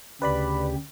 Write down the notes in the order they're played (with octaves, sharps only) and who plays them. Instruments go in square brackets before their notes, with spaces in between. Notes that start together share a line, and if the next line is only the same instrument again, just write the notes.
[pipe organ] D2 C#3 G4 [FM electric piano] B4 D5 B5